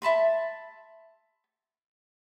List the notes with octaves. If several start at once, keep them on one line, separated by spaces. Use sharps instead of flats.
E5 A5 B5 C6